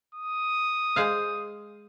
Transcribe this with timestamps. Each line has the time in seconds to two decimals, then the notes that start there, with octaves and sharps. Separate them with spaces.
0.15 D#6
0.96 G#3 C5 F5